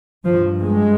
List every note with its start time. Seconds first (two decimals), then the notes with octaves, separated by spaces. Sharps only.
0.24 G2 F3
0.62 G#3